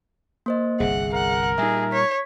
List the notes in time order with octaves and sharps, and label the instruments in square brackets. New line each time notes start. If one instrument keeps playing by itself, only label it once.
[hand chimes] A#3 C5 D#5
[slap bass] G1 C2 [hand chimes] G#4 E5 [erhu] F#5
[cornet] A#4 [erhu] F#5
[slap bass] A#2 G3 [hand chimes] D#4 E5 [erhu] G#4
[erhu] C#5 [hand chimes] B6